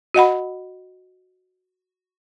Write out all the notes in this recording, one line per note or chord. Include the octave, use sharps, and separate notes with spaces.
F#4 D#5 F#5 B5